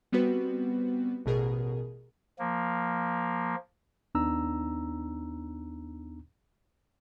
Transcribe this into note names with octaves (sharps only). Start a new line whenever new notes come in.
G3 B3 C4 F#4 B4
A1 B2 G#4 A#4
F3 A#3
D#2 B3 D4 D#4 A#5 E6